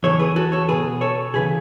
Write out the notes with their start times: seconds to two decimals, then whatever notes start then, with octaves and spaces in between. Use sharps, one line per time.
0.03 E2 C#3 E3 A4 C#5
0.19 G#4 B4
0.36 F#4 A4
0.52 A4 C#5
0.69 C#2 G#4 B4
0.72 B2
1.01 A4 C#5
1.34 D2 C#3 E3 G#4 B4